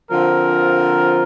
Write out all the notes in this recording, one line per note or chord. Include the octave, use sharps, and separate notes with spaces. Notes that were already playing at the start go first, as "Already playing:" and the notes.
D3 F3 C4 F4 A#4